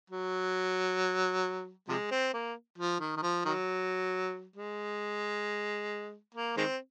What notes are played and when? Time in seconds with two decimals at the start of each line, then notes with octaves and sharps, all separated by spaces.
0.10 F#3
1.88 C3 F3 G#3
2.11 C4
2.33 A#3
2.78 F3
3.00 D#3
3.17 D#3
3.22 F3
3.45 D#3 F#3
4.56 G#3
6.35 A#3
6.57 D#3 G#3 C4